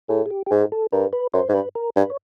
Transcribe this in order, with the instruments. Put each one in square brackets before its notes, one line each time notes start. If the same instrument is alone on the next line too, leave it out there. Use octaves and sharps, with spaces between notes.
[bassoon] A2 [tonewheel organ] G#4
[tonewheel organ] G#4
G4
G4
[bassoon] G#2 [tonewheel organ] G#4
[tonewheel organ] A4
[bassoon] G2 [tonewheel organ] A#4
[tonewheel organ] B4
[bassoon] F#2 [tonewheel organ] C5
[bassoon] G#2
[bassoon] G2 [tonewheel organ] B4
[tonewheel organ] A#4
[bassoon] G2 [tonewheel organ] B4
[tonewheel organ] C#5